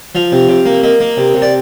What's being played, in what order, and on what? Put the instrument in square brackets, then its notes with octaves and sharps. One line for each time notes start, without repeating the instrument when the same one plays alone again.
[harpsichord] F3 F5
C3
C3
A#3
A#3 D#5
A#3
C3
C3
D5